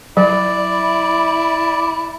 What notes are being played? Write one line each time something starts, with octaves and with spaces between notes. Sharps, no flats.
F#3 E4 D5